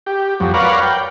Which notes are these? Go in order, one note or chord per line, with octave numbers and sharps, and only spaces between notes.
G4
F2 F#3 G3
A#4 B4 C#5 D5 F5 F#5
G5